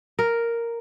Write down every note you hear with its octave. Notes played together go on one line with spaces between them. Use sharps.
A#4